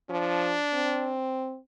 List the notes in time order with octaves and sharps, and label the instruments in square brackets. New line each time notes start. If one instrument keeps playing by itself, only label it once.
[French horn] F3 [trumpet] D4
[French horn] C4